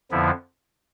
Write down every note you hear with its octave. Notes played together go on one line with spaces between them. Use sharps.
F2 D3 F3 B3 E4